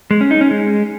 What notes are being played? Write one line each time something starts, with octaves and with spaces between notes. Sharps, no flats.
G#3
C#4
D#4
C#4
G#3